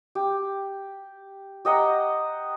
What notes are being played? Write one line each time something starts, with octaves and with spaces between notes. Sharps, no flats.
G4
G4 D#5 F#5 A#5